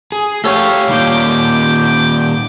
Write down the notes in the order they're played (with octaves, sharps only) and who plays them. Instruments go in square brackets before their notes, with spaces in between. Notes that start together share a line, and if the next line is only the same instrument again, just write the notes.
[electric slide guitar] G#4
[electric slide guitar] A3 G4 [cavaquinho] A4 C#5 F5
[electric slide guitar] A#2 D#3 G3 [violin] D6 G6